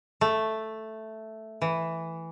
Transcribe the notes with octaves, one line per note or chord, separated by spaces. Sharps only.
A3
E3